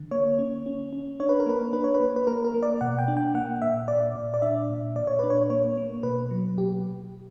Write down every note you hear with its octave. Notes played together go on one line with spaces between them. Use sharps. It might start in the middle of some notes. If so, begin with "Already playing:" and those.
Already playing: D3
A#3 C#5
C#4
C#4
C#4
D4 C#5
B4
A#4
A#3 B4
D4 B4
C#5
B4
A#3
B4
A#3 A#4
A#4
A#3
D5
B2 F#5
G5
D4
G5
A#3 F#5
A#2 E5
A#2 D5
A#2
D5
D4 E5
A#2
A#2 D5
C#5
D4 B4
C#5
A#3 C#5
A#3
B2 B4
F#3
B2 G4